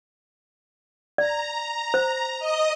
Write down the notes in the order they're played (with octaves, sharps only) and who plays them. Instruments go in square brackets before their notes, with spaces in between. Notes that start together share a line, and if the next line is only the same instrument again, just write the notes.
[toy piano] D5 [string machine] A#5
[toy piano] C5
[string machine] D#5 D#6